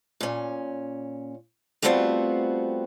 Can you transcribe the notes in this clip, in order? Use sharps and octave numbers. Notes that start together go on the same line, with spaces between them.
A#2 C#4
G3 A3 B3 C4 F4 F#4